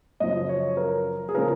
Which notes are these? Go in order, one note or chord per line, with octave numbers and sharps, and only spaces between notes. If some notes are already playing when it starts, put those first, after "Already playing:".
F#2 C#3 F3 D#5
C#5
A#4
G#4
C#3 F3 A#4